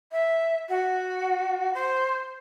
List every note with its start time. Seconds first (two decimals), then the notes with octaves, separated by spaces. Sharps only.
0.12 E5
0.69 F#4
1.74 C5